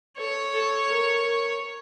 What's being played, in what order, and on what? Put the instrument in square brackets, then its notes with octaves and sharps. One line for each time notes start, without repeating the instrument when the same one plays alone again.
[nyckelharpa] A4 [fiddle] C#5
[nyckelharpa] A4
A#4